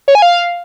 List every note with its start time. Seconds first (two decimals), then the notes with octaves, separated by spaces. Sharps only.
0.08 C#5
0.15 G#5
0.22 F5